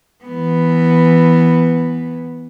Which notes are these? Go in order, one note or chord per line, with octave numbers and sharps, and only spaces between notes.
E3 B3